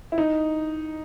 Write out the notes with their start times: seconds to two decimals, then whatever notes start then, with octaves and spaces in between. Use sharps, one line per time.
0.12 E4
0.18 D#4